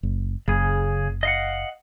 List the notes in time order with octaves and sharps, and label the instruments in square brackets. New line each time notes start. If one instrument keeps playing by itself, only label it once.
[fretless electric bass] F#1
[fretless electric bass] F#1 [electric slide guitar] C#3 G#4
[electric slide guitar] D#5 F5 F#5